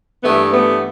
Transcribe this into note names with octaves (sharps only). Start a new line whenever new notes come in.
G2 E3 A3 B3
A3 B3